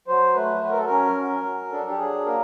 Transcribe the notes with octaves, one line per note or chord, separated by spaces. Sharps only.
F#3 C5
A3 B4
F#3 B4
A#4
A4
C#4 A#4
F#3
F#3
D4 A4
G4
F#3 G#4
A#3 A#4